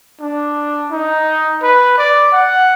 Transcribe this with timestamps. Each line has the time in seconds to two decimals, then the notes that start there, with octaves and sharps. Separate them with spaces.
0.21 D4
0.91 D#4
1.63 B4
1.98 D5
2.32 F#5